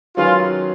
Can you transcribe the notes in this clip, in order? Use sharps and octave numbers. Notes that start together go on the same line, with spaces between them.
D#3 F#3 C#4 F4 G#4 B4